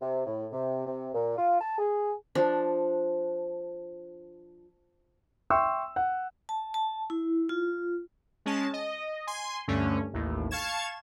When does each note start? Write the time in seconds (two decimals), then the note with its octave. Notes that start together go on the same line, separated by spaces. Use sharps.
0.02 C3
0.27 A2
0.53 C3
0.87 C3
1.14 A#2
1.38 F4
1.61 A5
1.79 G#4
2.35 F3 D4
5.50 E5 G5 C6 C#6 E6
5.96 F#5
6.49 A5
6.74 A5
7.10 E4
7.49 F4
8.46 G#3 C#4 A5
8.73 D#5
9.27 G#5 C6
9.68 D2 G2 D3 A3 C#4
10.13 A1 D#2 A2
10.51 F5 A5 C#6 G#6 E7